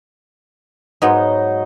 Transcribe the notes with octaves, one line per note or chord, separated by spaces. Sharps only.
G#2 F#3 B3 D#4 D#5